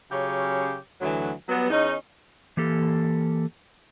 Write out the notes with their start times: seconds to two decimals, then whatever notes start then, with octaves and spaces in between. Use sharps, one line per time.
0.11 C#3 F#3 C#4 G4 C#5
1.00 D2 D3 E3 F#3
1.48 F#3 G3 B3
1.70 E2 C#4 D#4
2.57 E3 A#3 G4 A4